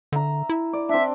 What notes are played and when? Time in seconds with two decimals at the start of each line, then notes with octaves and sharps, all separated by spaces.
0.12 D3 E5 A#5
0.49 E4
0.73 D5
0.89 C4 D4 E5